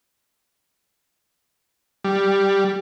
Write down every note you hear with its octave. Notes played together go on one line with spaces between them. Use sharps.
G3